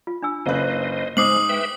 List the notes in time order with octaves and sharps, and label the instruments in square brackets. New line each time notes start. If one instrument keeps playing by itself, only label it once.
[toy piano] F4
D4 G#5 E6
[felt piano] F#1 C#3 B4 [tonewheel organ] C5 D#5
[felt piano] G#2 [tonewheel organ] G#3 [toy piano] C5 D6 [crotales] D#6 C7 F#7
[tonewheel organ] B4 E5 G5